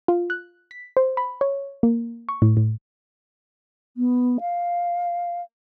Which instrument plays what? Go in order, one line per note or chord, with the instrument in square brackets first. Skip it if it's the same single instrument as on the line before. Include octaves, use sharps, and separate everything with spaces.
[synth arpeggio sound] F4
F#6
B6
C5
B5
C#5
A#3
C#6
A2
A2
[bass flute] B3
F5